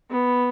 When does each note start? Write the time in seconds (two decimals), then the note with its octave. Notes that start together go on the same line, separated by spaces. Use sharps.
0.10 B3